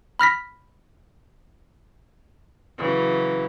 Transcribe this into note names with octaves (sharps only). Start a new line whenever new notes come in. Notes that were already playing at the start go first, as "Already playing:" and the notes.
B5 F6 A#6 B6
C#3 E3 F#3